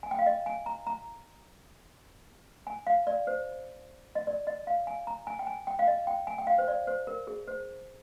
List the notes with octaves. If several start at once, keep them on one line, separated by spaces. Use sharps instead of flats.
G#5
G5
F5
D#5
G#5
A#5
A#5
G#5
F5
D5
C5
D#5
D5
D#5
F5
G#5
A#5
G#5
G5
G#5
G5
F5
D#5
G5
G#5
G5
F5
C5
D5
C5
A#4
G#4
C5